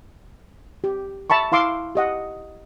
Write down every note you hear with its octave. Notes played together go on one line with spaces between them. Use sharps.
G4
E5 A5 B5 C#6
E4 F5 C6 D6 E6
G4 D#5 F#5